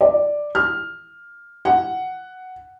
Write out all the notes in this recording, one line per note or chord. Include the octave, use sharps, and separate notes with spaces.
D5
F6
F#5